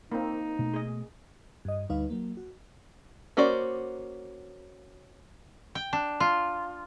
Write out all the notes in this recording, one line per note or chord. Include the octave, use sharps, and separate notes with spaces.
A#3 C4 D#4
B2 A3
G#4 D#5
G2 D#5
D2 G3 D#4 B4 F5
F#3 A#3
F#4
A#3 C#4 F#4 C5 D5
G5
D4
F4